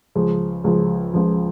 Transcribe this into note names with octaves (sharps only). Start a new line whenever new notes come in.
C#2 C#3 F3
C#2 C#3 F3
C#2 C#3 F3